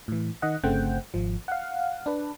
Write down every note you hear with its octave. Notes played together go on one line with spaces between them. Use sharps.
A2 E3
D#3 D#5 F#5
G1 C#3 A3 C4 F#5 G5
G#1 F3
F5 F#5
D4 B4